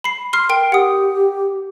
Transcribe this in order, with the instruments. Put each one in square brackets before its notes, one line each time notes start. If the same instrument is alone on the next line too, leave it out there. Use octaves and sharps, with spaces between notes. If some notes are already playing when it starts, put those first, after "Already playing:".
[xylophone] B5 C7
C6 F6 C7
A#4 G5 D7
[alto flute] G4 [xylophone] F#5 D#6